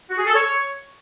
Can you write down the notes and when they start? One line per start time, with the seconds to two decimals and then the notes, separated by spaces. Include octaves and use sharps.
0.09 F#4
0.18 G#4
0.27 A4
0.35 C#5